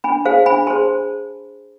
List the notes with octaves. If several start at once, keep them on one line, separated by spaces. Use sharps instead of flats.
D4 G#5 B5
G#4 C5 F5 A5
D4 G#5 B5
G#4 C5 A5 C6